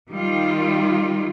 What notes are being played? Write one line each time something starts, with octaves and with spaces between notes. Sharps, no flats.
D#3 G3 F4